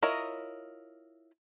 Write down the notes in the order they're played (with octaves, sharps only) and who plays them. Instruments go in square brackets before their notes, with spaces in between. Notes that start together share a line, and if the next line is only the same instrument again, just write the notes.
[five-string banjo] E4 F4 A#4 C#5 D#5